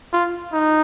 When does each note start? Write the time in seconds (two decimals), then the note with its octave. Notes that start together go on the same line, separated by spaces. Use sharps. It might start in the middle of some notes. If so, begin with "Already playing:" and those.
0.13 F4
0.53 D#4